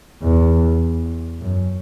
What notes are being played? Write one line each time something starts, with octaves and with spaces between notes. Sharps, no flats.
E2
F#2